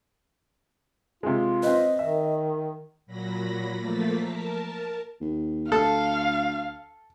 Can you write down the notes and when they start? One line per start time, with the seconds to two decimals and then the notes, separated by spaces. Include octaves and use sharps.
1.23 C3 G#3 F4
1.63 C4 B4 D#5
1.99 D#3 E5
3.06 A#2 F#3 B5 A#6
3.79 F3 A3 A#3 A6 B6
4.15 A#4 A5
5.21 D#2
5.72 D2 A4 F5